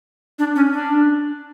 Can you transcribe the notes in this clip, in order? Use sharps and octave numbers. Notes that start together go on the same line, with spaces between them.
D4
C#4
D4